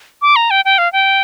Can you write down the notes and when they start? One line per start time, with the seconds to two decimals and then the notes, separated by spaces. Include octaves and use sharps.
0.22 D6
0.36 A#5
0.51 G5
0.65 G5
0.78 F5
0.93 G5